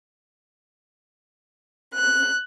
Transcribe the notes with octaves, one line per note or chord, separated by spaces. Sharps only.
F#6